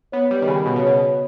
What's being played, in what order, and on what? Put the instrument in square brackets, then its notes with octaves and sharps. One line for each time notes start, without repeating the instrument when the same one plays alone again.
[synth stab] B3 [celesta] C#5
[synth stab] G3
D#3
[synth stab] C#3 [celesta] G#5 B5
[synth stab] B2
C#3
[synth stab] B2 [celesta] C#5